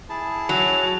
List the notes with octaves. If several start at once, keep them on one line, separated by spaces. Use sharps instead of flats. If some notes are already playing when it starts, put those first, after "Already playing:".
E4 G#4 A5
F#3 F7